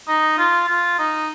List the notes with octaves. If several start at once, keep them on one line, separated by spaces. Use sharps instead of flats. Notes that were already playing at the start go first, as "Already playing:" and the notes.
D#4
F4
F4
D#4